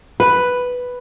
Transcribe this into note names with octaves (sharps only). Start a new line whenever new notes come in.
B4